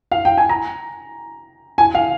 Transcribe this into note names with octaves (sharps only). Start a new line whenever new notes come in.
F5
G5
G#5
A#5
G#5
F5